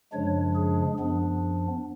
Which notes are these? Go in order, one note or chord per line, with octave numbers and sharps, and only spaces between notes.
F#2 C#3 F3 G#3 D4 C#5
G#4
F#2 F3 B3 D4